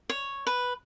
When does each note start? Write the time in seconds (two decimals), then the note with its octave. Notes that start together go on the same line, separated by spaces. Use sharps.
0.09 C#5
0.47 B4